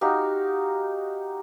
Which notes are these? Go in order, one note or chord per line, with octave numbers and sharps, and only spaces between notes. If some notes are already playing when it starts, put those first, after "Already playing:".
D#4 F#4 G4 F5